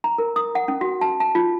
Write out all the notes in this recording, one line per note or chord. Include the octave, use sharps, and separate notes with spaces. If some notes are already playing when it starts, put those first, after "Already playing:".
A#5
A#4
D#6
F#5
C#4
F#4
A5
A5
F4